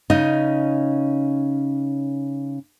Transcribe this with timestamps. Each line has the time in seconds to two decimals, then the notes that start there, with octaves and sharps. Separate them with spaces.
0.10 C#3 C#4 D#4 D#5